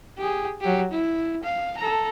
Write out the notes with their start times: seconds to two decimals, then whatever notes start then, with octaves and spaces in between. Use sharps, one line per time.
0.18 G4 G#4
0.61 F#3 G4
0.91 E4
1.43 F5
1.78 A4 A#5